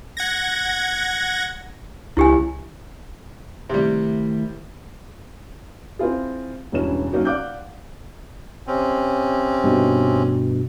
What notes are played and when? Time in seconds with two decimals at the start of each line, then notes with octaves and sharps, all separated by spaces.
0.17 F#5 G#6 A#6
2.17 C#2 E4 G4 G#5
3.70 C3 D#3 G3 A3 E4
5.99 C4 E4 F4 G#4
6.72 E1 G2 E3 C#4 E7
7.12 F#3 A#3 C#4 D#4 F#4
7.25 D5 F5 F#5 D6 F#6 G6
8.67 C3 C4 C#4
9.64 G2 B2